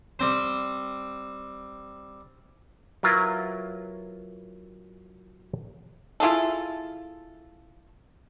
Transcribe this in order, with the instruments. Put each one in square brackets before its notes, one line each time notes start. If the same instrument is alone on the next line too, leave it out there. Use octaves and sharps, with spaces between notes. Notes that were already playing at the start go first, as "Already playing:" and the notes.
[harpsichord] G3 C4 C5
[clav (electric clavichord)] F#3 E4 F4 A#4 B4
[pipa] E4 F4 G#4 A4